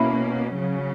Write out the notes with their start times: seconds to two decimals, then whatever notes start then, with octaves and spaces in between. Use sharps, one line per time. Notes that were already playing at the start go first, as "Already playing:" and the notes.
Already playing: B2 A#3 C#4 E4
0.55 C#3 F#3 C#4